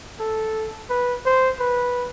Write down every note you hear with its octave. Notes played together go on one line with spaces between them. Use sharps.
A4
B4
C5
B4